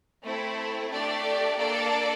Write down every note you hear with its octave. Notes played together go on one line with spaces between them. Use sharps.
A3 C4 E4
A3 D4 G4 D5
A#3 D4 A4 D5